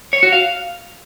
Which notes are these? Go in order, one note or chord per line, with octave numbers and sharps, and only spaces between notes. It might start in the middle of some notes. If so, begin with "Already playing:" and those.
C#5
F#4
F5